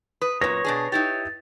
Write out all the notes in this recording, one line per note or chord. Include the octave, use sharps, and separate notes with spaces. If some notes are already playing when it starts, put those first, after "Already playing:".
B4 D#6
F#2 A#2 B4 C#5 A#6
B2 D4 G#4
D#4 E4 G4 A6